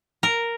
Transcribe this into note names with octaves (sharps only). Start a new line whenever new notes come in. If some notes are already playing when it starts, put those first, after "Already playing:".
A#4